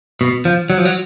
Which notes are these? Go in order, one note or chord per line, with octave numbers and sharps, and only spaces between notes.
B2
F3
F#3
F3
F#3